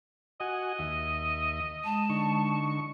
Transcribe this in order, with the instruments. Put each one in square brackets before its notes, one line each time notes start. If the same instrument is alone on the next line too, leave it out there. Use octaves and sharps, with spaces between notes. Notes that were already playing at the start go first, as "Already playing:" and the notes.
[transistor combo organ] F#4 F#5 G#5 [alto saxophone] D#5
[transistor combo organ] D#2 E5
[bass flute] G#3 [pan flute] A5
[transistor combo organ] D3 D#4 C#6